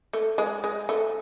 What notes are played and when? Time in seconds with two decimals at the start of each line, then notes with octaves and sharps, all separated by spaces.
0.13 A3
0.38 G#3
0.64 G#3
0.89 A3